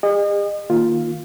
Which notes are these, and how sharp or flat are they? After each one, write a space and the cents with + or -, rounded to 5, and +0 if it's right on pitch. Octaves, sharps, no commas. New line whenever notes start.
G#4 -45 D#5 -35
D#3 +0 A#3 +0 F4 +0